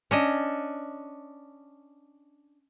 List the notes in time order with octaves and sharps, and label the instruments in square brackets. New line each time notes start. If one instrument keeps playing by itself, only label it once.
[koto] C#4 D4 D#5